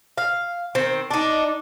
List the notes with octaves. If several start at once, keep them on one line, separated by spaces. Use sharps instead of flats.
F5
D#3 C4
D4 D#4